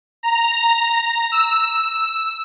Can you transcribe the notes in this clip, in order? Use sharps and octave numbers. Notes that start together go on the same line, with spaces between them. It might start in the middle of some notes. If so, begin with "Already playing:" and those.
A#5
E6